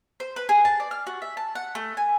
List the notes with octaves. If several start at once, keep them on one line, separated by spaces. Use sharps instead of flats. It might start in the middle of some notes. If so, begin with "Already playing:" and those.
C5
B4
G#4
A5
D5
F6
F#4
E5
A5
F#5
A3
G#5